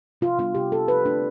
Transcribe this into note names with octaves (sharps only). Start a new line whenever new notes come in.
C3 F4
G3 B3 D4 F4
C3 G4
G3 B3 D4 A4
F3 B4
A3 C4 D4